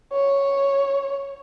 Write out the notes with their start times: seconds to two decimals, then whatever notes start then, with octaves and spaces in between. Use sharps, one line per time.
0.13 C#5